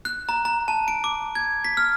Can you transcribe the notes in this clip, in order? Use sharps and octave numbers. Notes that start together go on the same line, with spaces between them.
F#6
A#5
A#5
A5
D7
D6
G#6
B6
F6